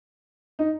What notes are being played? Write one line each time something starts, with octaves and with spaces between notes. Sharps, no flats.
D#4